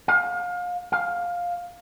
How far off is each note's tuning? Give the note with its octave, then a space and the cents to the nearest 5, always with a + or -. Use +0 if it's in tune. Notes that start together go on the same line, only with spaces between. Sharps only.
F5 +30
F5 +10